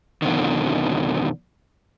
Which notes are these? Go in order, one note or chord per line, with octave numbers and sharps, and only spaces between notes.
F2 B2 D3 D#3